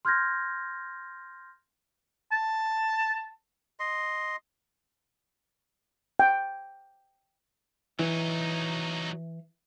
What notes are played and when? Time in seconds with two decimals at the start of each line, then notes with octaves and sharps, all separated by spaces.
0.05 C6 F6 G6 G#6 A#6
2.32 A5
3.80 D#5 C6
6.19 G5
7.99 E3 F#3 D#4